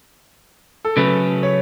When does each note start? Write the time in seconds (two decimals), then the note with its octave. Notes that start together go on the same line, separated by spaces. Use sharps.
0.85 A4
0.97 C#3 F#3 A3 C#4 B4
1.43 C#5